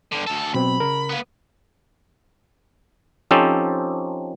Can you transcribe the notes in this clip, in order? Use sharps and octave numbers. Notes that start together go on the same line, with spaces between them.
G2 D3
D2 A4
B2 F#3 C4 B5
C#3 A#4
A#3 B3
F3 C4 C#4 D#4 G4 A4